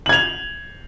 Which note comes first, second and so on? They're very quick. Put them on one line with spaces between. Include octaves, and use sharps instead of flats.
F#7 G#6 F7